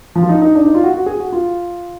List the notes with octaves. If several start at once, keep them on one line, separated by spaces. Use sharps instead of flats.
F3
F4
D#4
D#4
D4
D#4
F4
F#4
F#4
G#4
F#4
F4